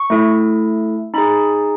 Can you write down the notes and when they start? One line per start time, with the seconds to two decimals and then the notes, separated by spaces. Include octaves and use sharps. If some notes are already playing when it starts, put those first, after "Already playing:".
Already playing: C#6
0.10 A3 E4 A4
1.14 D#4 G#4 B5